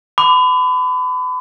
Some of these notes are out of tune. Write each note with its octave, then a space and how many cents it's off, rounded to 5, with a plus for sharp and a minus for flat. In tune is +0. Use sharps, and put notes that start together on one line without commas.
B5 +35 D6 +0